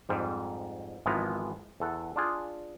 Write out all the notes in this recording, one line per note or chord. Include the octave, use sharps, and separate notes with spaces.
F2 G#2 G3
G#1 E3 F3 G#3 B3 A#5
E2 A4 F#5
D4 F4 G#4